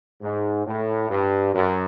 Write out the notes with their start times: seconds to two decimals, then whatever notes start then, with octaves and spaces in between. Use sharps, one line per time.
0.22 G#2
0.66 A2
1.09 G2
1.54 F#2